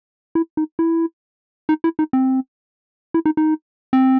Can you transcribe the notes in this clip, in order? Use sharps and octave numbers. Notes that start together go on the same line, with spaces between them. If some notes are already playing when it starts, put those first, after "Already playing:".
E4
D#4
E4
D#4
E4
D#4
C4
E4
D#4
D#4
C4